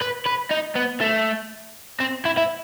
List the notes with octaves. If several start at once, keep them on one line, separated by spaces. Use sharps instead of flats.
B4
B4
D#4
B3
A3
C4
E4
E4